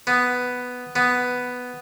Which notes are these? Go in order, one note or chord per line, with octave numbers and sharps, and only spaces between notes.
B3
B3